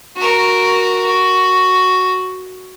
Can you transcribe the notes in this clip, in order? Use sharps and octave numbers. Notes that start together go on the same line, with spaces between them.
F#4 A#4
F#4